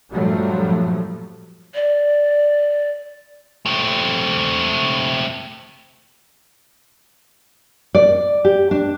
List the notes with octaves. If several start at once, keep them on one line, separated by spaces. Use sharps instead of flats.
G2 A#2 F3 F#3 A3
D5
A3 C4
D5
G4
D4